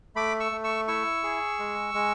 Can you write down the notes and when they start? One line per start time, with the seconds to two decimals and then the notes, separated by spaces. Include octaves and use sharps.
0.16 A3 B5 D6
0.40 C#6 E6
0.52 A3
0.64 C#6 E6
0.88 E4 C#6 E6
1.24 G#4
1.59 G#3
1.94 G#3